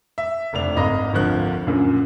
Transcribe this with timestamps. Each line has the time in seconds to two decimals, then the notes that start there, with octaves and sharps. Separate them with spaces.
0.18 E5
0.53 F1 G2 D4 F7
0.76 G#1 D#5 F5 A#5 B5 A#6
1.13 G#1 D2 F3 F#6
1.66 F#2 A#2 D3